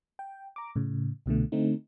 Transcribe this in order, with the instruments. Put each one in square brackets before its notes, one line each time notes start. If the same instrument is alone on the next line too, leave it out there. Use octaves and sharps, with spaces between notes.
[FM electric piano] G5
A#5 D6
A2 C#3
C2 B2 D3 A3
D3 A3 C4 D#4